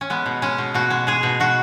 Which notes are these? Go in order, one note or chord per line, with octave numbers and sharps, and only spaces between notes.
C#4
G#3 B3
B2
G#3 C#4
B2
B2 F#4
G#3
G#3 G#4
B2
B2 F#4